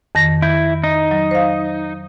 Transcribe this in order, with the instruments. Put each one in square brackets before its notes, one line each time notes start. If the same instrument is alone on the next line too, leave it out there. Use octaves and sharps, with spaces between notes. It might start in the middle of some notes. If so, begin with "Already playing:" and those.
[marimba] F2 D#3 A#6
[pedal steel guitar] E4 [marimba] G6
[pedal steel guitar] D#4
[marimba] F#3
C5 F5